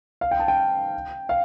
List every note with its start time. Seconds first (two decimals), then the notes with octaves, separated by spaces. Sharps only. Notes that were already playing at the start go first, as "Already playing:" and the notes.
0.21 F5
0.31 G5
0.40 A5
0.48 G5
1.29 F5